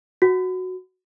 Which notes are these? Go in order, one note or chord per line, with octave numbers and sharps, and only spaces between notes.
F#4